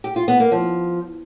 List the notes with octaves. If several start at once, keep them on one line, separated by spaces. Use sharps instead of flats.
G4
F4
B3
A#3
F3